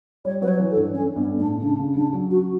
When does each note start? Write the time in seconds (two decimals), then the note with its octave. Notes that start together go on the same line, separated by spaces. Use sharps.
0.25 G3 C#5
0.42 F#3 B4
0.48 C#5
0.60 E3
0.71 A4
0.77 G2
0.94 C#4
1.16 G2 B3
1.38 A2 D4
1.61 C#3 D4
1.79 C#3
1.96 C#3 D4
2.13 F#3
2.30 F#4